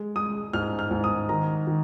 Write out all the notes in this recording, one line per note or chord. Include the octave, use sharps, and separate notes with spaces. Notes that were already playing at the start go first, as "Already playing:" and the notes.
Already playing: G#3
G#3 D#6
G#2 F6
F6
G#2
D#6
D#3 A#5
D#3